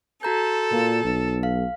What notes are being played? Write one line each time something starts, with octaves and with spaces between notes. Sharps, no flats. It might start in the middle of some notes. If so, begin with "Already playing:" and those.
F#4 A4 A#5 G6
A#2
B1
F5